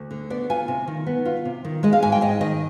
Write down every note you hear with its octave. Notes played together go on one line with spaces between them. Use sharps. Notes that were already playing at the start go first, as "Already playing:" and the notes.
Already playing: D2
D3
B3 D5
F4 G#5
C3
D#3
B3
F4
C3
D#3
G#3 D#5
F5
G#2 G#5
G5
G#2 D#5
D#3 D#5